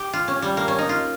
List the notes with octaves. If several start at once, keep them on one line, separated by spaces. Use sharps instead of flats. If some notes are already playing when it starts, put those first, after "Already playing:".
Already playing: G4
F4
C#4
G3
A#3
C#4
D#4
F4